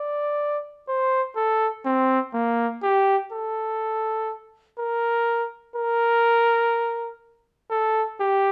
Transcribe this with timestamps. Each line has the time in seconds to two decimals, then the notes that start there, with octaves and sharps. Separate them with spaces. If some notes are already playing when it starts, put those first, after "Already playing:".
Already playing: D5
0.88 C5
1.36 A4
1.85 C4
2.34 A#3
2.83 G4
3.32 A4
4.78 A#4
5.76 A#4
7.70 A4
8.20 G4